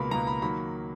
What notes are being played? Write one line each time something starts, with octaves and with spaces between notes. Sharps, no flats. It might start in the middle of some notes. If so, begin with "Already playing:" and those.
Already playing: C#2 B2 A#3 B5
C#2 B2 A#3 A#5
B5
D#3 F#3 A#3 B5